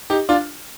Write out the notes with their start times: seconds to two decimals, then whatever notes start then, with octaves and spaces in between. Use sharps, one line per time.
0.10 D#4 G4
0.29 D4 F4